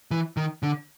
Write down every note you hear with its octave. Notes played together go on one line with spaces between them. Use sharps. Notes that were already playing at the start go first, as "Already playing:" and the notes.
E3
D#3
D3